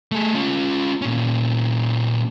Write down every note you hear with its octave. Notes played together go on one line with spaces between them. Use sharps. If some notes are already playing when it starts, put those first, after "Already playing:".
A3 G#4
C#4 F4
A#2 C#4